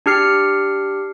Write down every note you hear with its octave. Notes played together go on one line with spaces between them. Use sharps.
D4 G4 F6 C7 C#7